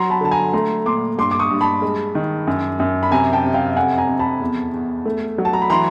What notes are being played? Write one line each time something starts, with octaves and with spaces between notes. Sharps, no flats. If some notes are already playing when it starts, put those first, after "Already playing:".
Already playing: F#3 A#5 C6
A5 B5
D3 A5
G#5 A#5
A3 A#5 C6
A#2 C6 D6
G2 C6 D6
D6
C#6 D#6
G2
A5 B5
G#3
D#3
F#2
F#2
B5
C3 G#5 A#5
G5 A5
C3
F5 G5
F2 F#5 G#5
G#5 A#5
F2
A5 B5
E2
E2
A3
F#3
A5
A#5
B5
E3 A#5 C6